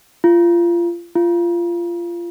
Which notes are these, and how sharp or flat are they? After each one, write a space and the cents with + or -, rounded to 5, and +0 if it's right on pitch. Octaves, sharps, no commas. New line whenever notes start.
F4 -25
F4 -20